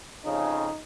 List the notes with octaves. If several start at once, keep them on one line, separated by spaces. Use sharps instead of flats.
F2 C#3 D#4